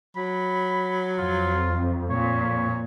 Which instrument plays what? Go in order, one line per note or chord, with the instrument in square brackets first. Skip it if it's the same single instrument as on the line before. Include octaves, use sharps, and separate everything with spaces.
[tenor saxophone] F#3 [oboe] B5
[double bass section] F2 [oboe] F4
[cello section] A#2 [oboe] C#5